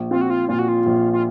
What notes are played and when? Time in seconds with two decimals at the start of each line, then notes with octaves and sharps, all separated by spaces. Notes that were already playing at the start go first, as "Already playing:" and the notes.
Already playing: A#1
0.11 C4 F4
0.21 F#4
0.30 F4
0.48 A#2 F4
0.59 F#4
0.68 F4
0.86 A#1
1.13 F4